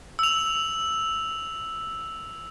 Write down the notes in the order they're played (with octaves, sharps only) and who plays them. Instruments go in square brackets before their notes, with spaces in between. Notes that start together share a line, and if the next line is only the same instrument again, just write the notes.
[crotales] E6 F7